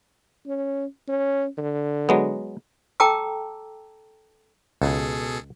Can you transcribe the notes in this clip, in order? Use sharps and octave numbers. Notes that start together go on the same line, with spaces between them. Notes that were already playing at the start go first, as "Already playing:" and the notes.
C#4
C#4
D3
F#3 G#3 B3
A4 G5 A5 A#5 D6 E6
C#2 B2 G#4 A4